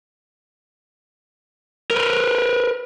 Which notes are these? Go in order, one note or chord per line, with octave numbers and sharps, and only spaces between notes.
A#4 B4